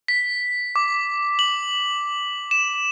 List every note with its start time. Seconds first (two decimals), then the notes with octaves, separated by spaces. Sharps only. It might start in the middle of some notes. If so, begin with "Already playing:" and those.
0.08 B6
0.76 D6
1.39 F#7
2.51 E7